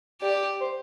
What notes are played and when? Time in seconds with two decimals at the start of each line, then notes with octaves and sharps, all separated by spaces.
0.21 G4 D5
0.60 C5